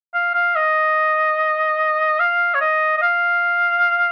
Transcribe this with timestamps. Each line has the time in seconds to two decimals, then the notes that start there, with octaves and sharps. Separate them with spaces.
0.14 F5
0.35 F5
0.55 D#5
2.20 F5
2.54 C#5
2.61 D#5
2.97 D#5
3.02 F5